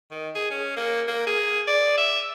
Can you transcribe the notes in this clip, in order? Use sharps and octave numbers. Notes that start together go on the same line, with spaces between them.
D#3
G#4
C#4
A#3
A#3
G#4
D5
E5